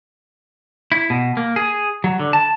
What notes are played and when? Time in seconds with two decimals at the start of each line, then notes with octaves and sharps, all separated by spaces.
0.92 E4
1.10 B2
1.37 A#3
1.56 G#4
2.04 F#3
2.20 D3
2.33 A5